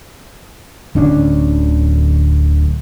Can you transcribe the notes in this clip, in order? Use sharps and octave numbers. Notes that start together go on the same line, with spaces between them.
D1 D2 C#4 D4